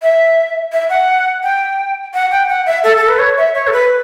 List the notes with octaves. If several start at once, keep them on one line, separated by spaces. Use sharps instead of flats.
E5
E5
F#5
G5
F#5
G5
F#5
E5
A4
A4
B4
C#5
E5
C#5
A4
B4